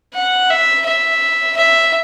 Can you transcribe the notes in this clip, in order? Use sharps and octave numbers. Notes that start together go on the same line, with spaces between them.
F#5
E5
E5
E5